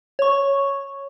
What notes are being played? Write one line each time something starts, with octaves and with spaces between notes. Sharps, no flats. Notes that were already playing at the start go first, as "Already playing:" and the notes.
C#5 C#6